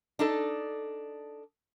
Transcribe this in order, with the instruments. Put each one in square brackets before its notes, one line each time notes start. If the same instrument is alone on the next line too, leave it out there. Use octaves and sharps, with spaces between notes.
[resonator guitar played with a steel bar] D4 D#4 A4